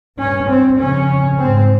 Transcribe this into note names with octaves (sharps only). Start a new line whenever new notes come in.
G2 C#4
C4
F2 C#3 C#4
G#2 C4